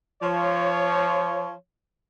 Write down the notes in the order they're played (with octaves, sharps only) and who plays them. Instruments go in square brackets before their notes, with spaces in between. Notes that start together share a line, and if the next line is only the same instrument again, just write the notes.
[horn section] F3 C#5